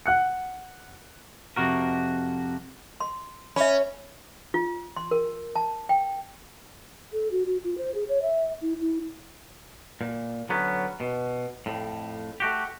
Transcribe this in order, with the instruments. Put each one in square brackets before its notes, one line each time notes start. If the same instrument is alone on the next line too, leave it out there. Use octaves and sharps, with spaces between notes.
[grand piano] F#5 F#6 C#7
[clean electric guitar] F2 C3 F#4 A#4
[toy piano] C6
[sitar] C#4 [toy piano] E5 B5
[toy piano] F4
C6
A#4
A5
G5
[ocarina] A4
F#4
F#4
F4
C5
G#4
C#5
E5
E4
E4
[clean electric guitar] A#2
D3 F#3 B3 C#4
B2
F2 A2
A3 F#4 G4